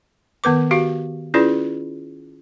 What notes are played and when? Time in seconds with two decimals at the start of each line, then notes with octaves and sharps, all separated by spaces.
0.44 D#3 B3 B4 D6
0.71 F#4 G4 F5
1.34 C#4 E4 F4 G#4 B4 D5